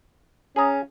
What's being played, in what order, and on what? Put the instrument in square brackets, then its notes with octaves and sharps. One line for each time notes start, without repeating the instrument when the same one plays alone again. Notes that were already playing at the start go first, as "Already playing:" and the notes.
[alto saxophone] C#4 [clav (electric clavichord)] G#4 A#5